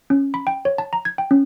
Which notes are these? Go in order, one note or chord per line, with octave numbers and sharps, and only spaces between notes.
C#4
B5
G5
C#5
A5
A#5
G#6
G5
C#4